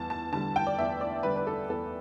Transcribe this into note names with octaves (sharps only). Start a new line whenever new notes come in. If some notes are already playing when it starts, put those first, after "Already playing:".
Already playing: E2 G3 A5
A5
D3 G3 A5
G5
D5
E2 E5
D5
D3 G3 B4
B4
A4
E2 A4